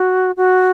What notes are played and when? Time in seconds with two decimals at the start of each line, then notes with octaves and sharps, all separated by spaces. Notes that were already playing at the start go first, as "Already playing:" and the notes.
Already playing: F#4
0.37 F#4